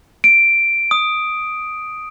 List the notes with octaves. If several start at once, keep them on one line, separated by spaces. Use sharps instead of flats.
D7
D#6